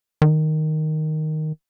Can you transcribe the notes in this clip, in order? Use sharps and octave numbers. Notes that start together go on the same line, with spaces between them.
D#3